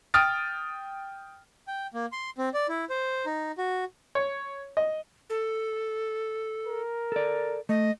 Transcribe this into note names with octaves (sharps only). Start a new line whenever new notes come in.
G5 D#6 F6 A6 D7
G5
A#3
C6
C4
D5
E4
C5
D#4
F#4
C#5
D#5
A4
A#4
A4 D5
A3 D#5